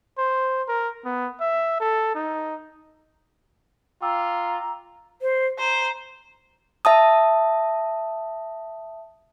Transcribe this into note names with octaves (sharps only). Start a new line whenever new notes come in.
C5
A#4
B3
E5
A4
D#4
F4 G5 A#5 D6 E6
C5
C5 A#5
E5 A5 D#6